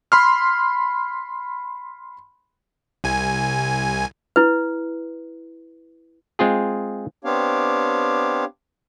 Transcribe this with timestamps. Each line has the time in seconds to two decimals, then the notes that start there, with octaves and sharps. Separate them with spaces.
0.12 B5 C6 F6
3.04 C2 G#5
4.36 E4 B4
6.39 G#3 C4 F4 G#4
7.24 B3 C4 D4 G4 C#5 F5